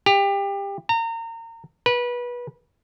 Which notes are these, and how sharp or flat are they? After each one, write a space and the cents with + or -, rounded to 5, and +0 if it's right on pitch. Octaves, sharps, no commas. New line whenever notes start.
G4 +25
A#5 -30
B4 -25